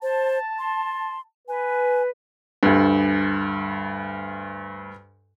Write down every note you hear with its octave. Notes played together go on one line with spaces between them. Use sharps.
C5 A5
C6
B4 G#5
D2 G2